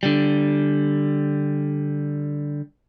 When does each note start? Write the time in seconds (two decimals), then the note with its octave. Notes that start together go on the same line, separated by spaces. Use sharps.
0.03 D3 G3